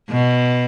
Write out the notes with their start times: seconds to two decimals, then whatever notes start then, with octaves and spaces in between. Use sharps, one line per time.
0.10 B2